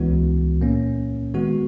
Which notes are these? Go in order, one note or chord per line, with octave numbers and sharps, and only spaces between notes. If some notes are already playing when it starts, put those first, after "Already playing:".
Already playing: C#2 C#3 E3 B3 F#4
A#2 A#3 C#4
D#3 G#3 B3 F#4